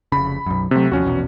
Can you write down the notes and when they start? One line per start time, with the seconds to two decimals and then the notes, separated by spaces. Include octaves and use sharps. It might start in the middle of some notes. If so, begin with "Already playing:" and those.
0.12 F1 C#3 B5
0.46 B1 F#2
0.71 C3 F#3 A3 C4
0.92 D#2 F3 C#4 F#4
1.05 A#1 E2 B2